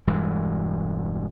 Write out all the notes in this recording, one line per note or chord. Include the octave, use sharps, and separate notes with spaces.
E1 G2 E3 G#3